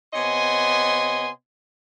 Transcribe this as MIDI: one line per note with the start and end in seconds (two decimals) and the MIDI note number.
0.14 1.29 48
0.14 1.29 59
0.14 1.29 73
0.14 1.29 75
0.14 1.29 80
0.14 1.29 84